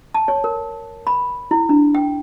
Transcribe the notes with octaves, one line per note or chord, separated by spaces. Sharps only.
A5
C#5
A#4
B5
E4
D4
G5